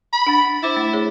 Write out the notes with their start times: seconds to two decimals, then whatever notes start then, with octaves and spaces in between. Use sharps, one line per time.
0.13 B5
0.27 D4 F#5 A6
0.63 E4 C5 D6 A6
0.77 A3
0.93 G#4 C#5